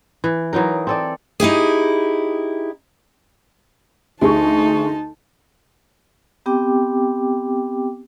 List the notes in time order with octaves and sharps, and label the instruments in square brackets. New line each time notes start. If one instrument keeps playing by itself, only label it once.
[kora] E3
E3 F#3 D#4 A#4
C4 A4 D5
[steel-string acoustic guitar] D#4 E4 G4 G#4
[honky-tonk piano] D2 G#4 C#6 [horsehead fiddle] D#4 A5
[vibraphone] B3 C4 G4 G5 D6